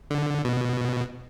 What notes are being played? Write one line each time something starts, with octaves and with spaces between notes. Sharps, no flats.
D3
B2